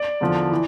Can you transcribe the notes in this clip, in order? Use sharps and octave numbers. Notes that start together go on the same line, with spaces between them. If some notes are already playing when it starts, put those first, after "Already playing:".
Already playing: D5
E2 D3 F3
E3